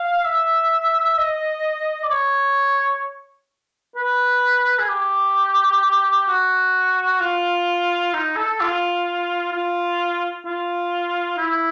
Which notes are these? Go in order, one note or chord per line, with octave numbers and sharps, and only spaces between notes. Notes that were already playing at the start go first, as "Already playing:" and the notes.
Already playing: F5
E5
D#5
D5
C#5
B4
G#4
G4
F#4
F4
D#4
A4
F4
F4
F4
E4